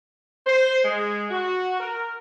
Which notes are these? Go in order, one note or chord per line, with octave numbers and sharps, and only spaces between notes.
C5
G#3
F#4
A#4